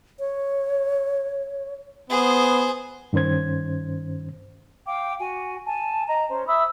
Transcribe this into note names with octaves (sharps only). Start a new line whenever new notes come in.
C#5
B3 G#4 C5
G2 D#3 C#4 C5 G#6
F5 G5 D6
F#4 G#5
G#5 A5
D#5 A#5
C#4 C5
E5 B5 D#6 E6